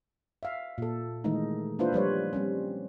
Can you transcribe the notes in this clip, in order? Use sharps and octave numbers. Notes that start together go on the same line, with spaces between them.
E5 F5
A#2 A4
D#3 E3 G#3 A3 D#4
A#3 D4 E4 F4 B4 C5
F3 G3 B4 C#5
G3 C4 C#4